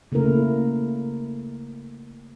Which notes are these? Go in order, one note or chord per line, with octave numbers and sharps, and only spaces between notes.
C#3 A3 A#3 E4 A#4